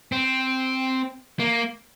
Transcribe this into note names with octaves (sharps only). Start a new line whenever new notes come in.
C4
A#3